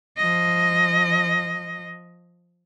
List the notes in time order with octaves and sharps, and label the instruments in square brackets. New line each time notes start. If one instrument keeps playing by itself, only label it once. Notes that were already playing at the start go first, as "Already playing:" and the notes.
[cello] F3 D#5